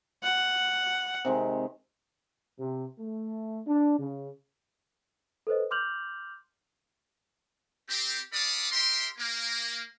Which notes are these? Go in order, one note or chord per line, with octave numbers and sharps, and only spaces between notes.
F#5
C3 D#3 G#3
C3
A3
D4
C#3
A4 B4 C5 D#5
C6 D6 F6 G6 F7 F#7
C4 G4
D4 A4 D5 F5 B5 D#6
G4 A#4 E5 C6
A#3